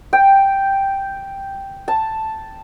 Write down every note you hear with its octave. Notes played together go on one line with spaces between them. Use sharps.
G5
A5